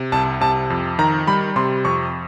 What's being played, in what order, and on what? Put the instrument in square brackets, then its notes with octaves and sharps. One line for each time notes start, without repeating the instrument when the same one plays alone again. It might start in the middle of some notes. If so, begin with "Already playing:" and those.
Already playing: [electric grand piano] C3
[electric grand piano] C2 [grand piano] A5
[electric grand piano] C3 [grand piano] A5
[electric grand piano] F2
[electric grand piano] D#3 [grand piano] A#5
[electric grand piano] G3 [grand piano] B5
[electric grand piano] C3 [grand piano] C6
[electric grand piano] F2 [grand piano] C#6